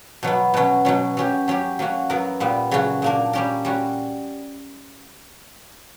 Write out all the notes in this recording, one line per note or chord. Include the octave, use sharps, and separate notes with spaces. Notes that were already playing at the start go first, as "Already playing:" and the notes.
B2 F#3 B3
B2 F#3 C#4
B2 F#3 C#4
F#3 C#4 G4
F#3 C#4 G4
F#3 A#3 C#4 F#4
F#3 B3 E4 A#4
A#2 G3 B3
C#3 F#3 C#4 F#4
A#2 A#3 D4 A#4
G3 C#4 G4 A#4
G3 C#4 F#4